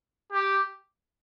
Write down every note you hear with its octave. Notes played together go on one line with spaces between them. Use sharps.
G4